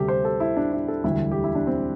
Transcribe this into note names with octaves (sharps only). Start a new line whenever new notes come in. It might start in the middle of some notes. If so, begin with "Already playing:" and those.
Already playing: D2 C3 G3 G4 A4
C5
A4
E4
D4
E4
A4
E1 D2 D3 G3 E4
G4
E4
D4
C4